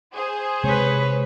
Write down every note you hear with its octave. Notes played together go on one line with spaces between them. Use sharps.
G#4 C5
C3 G#3 C4 B4 C#5